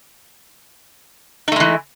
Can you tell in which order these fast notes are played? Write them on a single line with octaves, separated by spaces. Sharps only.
D#4 A3 G#3 E3